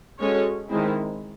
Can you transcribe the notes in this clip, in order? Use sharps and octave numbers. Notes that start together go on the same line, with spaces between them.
G#3 C#4 F#4 A4 C#5
D#3 G#3 C4 E4